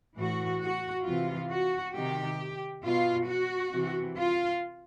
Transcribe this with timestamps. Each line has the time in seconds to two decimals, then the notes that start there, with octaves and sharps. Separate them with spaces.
0.15 A2 E3 F#4
0.60 F#4
1.06 C3 E3 F4
1.49 F#4
1.94 C3 D#3 G4
2.84 B2 F4
3.28 F#4
3.73 C3 E3
4.18 F4